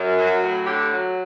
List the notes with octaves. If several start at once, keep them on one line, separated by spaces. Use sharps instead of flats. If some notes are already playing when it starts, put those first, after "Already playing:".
Already playing: F#2
F#3
A2
D3 G4
F#3